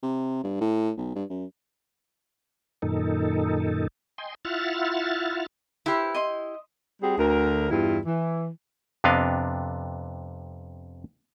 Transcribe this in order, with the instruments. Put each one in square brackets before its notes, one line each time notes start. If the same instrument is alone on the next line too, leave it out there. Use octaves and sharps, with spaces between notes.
[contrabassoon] C3
G2
A2
B1
G2
F#2
[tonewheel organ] F#2 A#2 D#3 D#4 A4
D#5 G5 G#5 C6
E4 F4 E5 F#5 F6 A6
[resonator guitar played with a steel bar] E4 G4 [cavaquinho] B4 C5 B5
[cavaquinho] D#5 C6
[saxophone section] G3 C4 F#4 G#4
D2 A#4
E2 G2 E4 F4
E3
[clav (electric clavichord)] F2 C3 B3 D4 D#5 F5